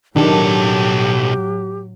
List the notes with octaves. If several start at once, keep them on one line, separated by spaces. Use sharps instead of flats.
B1 A2 D#3 F#3 D4 G4 A4